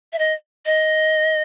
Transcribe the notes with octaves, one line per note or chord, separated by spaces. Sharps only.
E5
D#5
D#5